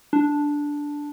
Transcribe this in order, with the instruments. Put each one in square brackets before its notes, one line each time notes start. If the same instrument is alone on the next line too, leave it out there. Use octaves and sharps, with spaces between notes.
[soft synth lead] D4